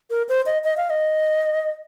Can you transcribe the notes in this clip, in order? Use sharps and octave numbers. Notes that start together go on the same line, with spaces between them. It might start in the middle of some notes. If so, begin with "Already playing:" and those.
A#4
C5
D#5
D#5
F5
D#5